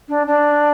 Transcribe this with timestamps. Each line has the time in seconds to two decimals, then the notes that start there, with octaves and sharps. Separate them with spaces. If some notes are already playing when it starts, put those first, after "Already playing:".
0.09 D4
0.27 D4